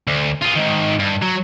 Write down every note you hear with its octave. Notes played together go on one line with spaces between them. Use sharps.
D2
F4 G#4
G#2 D#3
G2
F#3